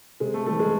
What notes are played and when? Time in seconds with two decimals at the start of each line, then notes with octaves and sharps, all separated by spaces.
0.20 C3 G#3
0.34 A3
0.46 E3 G3 A3
0.59 G#3